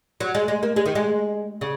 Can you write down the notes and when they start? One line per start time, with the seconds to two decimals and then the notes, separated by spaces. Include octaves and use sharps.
0.20 F#3
0.35 G#3
0.48 G#3
0.63 A#3
0.76 G#3
0.86 D#3
0.95 G#3
1.61 C#3